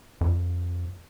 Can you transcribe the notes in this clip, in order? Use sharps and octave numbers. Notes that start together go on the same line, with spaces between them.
F2